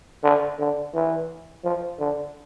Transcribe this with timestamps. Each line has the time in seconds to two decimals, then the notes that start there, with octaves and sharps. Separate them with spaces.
0.24 D3
0.59 D3
0.94 E3
1.64 F3
2.00 D3